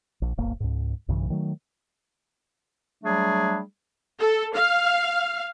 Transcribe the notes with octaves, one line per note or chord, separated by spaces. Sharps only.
A#1
D1 G1 A#3
C#2 G#2
B1 G2 C#3 E3
D#3 F#3 A3
F#3 G3 A3 D4 G#4
A4
F5